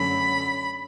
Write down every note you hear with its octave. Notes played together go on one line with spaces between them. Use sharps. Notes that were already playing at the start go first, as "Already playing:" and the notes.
Already playing: F#2 D3 A3 C#4 B5